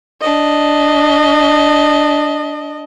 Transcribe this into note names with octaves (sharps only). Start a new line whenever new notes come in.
D4 D#5